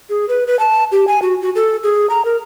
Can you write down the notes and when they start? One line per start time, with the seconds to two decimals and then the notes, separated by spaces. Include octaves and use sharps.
0.10 G#4
0.29 B4
0.47 B4
0.59 A5
0.92 G4
1.08 G#5
1.22 F#4
1.42 F#4
1.55 A4
1.83 G#4
2.10 A#5
2.25 A#4